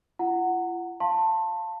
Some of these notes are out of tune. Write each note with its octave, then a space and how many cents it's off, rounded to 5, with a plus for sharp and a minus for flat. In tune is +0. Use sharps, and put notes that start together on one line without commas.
F4 -45 F#5 +0 A#5 -30
F5 +0 A5 +15 C6 +25